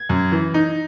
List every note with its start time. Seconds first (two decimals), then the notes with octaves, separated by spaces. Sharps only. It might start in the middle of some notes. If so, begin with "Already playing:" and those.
Already playing: G#6
0.09 F#2
0.32 E3
0.54 D#4